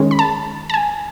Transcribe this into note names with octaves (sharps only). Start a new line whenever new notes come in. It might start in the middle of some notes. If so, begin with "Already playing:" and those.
Already playing: D#3 G#3 C#4
B5
A5
A5
G#5